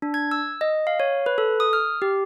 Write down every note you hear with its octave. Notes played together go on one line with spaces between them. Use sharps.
D4
G#6
E6
D#5
F5
C#5
B4
A4
D#6
F6
G4